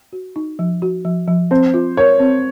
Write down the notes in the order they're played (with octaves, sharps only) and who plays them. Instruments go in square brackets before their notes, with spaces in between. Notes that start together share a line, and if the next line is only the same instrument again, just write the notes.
[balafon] F#4
D#4
F3
F#4
F3
F3
[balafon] C4 [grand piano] C5
[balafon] F4
[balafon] A#4 [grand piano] C#5
[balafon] C4